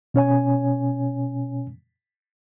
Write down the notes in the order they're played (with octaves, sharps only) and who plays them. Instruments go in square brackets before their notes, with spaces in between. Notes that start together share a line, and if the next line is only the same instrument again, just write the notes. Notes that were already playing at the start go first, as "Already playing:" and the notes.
[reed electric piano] B2 C#4 C#5 G#5